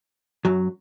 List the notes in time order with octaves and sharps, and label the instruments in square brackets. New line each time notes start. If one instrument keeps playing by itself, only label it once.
[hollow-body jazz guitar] F#2 F#3